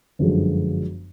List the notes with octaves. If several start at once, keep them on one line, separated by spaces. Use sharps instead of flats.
G1 F#2 D3 F3 G#3